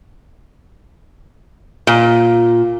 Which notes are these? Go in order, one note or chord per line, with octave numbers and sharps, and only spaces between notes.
A#2